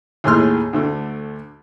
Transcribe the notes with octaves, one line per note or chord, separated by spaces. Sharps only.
D#2 A2 G#4 C6 F6
D2 D3 A3